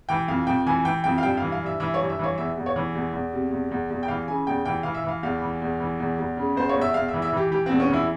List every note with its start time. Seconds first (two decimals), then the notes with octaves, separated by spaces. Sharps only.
0.09 E3 G5
0.28 F2 F5
0.47 F2 G5
0.66 E3 G#5
0.85 E3 G5
1.04 F2 G5
1.18 F5
1.23 G2 G5
1.37 E3 F5
1.52 F5
1.62 G2 E5
1.80 E3 E5
1.94 C#5
2.00 G2
2.10 E5
2.19 E3 C#5
2.38 E2 E5
2.57 E2
2.66 C#5
2.76 E3
2.95 E2
3.13 E2
3.33 C3
3.51 E2
3.71 E2
3.90 E2
4.03 G5
4.08 E3 F5
4.27 C#3 G#5
4.47 E2 G5
4.65 E3 G5
4.83 E3 F5
4.94 E5
5.04 E3 F5
5.23 E2 F5
5.42 E3
5.62 E2
5.80 E3
6.00 E2
6.19 E2
6.37 C#3
6.56 E2 C5
6.69 C#5
6.76 E2
6.81 E5
6.94 E2 F5
7.08 E5
7.14 E3
7.22 E5
7.33 E3 G4
7.51 E3 G4
7.66 E2 C4
7.80 C#4
7.90 E3 E4